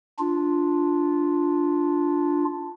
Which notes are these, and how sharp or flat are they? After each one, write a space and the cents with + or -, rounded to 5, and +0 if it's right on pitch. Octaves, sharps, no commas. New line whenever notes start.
D4 +0 F4 +0